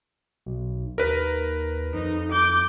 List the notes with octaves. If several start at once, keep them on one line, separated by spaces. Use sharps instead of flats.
B1
D#2 A#4 B4
F2 D#4
D6 G6